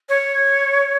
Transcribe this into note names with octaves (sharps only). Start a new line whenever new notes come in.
C#5